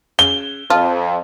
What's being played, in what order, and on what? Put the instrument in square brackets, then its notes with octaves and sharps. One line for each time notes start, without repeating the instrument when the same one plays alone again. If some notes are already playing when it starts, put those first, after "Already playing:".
[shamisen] C#3 [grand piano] G7
[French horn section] F2 [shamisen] F4 [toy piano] F5 A5 D#6